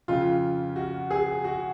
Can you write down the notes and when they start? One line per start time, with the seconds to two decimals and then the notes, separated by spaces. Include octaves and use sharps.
0.08 F2 C#3 F4
0.76 F#4
1.11 G#4
1.44 F#4